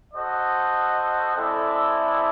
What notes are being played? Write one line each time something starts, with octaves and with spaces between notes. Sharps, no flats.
F#4 A4 C5 D#5
G#3 C4 E4 A4 D5